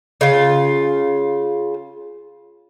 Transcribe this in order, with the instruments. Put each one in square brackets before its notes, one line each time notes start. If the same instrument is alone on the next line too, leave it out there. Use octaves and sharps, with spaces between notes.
[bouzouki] C#3 F4